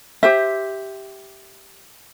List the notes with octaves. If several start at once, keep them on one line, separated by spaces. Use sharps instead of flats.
G4 C5 E5